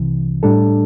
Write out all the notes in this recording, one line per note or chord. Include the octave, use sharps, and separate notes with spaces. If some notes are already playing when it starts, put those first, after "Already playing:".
Already playing: C2 C3 E3
A2 G3 D4 A4